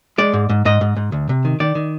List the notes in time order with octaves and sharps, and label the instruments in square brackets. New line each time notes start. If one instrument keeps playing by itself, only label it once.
[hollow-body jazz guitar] G#3 D5
G#2
G#2
G#2 D#5
G#2
G#2
D2
C3
D#3
D#3 D5
D#3